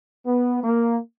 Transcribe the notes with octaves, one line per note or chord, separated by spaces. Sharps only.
B3
A#3